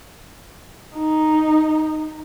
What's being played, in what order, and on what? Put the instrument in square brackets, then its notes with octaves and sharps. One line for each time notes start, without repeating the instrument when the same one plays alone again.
[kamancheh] D#4